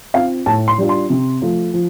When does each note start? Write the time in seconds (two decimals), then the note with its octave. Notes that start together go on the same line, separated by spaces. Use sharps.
0.14 C4 F4 F5
0.46 A2 A5
0.68 C6
0.78 G3 D4 F4
0.89 C6
1.10 C3
1.42 F3 A3 F4
1.74 F3